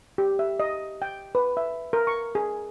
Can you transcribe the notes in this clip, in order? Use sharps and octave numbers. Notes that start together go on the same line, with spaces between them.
G4
E5
D#5
G5
B4
E5
A#4
C#6
G#4